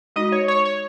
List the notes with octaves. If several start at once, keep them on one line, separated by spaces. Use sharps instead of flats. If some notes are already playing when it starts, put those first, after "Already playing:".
G#3 D#4 F#4 D#5
C#5
C#5
C#5